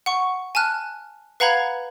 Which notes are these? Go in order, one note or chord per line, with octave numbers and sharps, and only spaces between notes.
F#5 C#6
G#5 A5 F6 F#6
B4 F5 F#5 A#5 B5 G#6